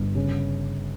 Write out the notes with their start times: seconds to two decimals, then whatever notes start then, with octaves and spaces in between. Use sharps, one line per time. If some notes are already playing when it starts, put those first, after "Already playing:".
Already playing: G1
0.15 C#3